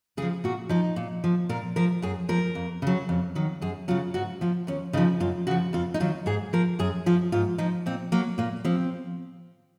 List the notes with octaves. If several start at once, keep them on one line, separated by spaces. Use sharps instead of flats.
C#3 F3 G#4
A#2 F#4
F3 D#4
A#2
F3
A#2 A#4
F3 A#4
F#2 G#4
F3 A#4
F2
C#3 F#3
F2
D#3 F#3
F#2 G#4
C#3 F#3 F4
G#2 F#4
F3 F4
D#2 C#4
C#3 F3 D#4
F#2 F4
C#3 F3 F#4
F2 F4
D#4
D#3 F#3 F4
G#2 G#4
F3 A#4
F#2 G#4
F3 F4
G#2 F4
F3 D#4
A#2 C4
F#3 A#3
A#2 A#3
F3 C4